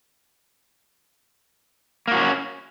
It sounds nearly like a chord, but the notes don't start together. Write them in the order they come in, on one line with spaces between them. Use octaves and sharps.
A#3 F#4 C#4